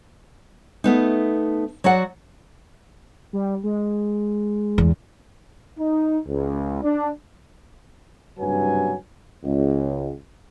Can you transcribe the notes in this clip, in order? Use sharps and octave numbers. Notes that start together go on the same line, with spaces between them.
A3 B3 D#4
F#3 F#4 D5 F#5
G3
G#3
E2 G2
D#4
C#2
D4
F#1 G2 C3 F#3 B4 G#5
C#2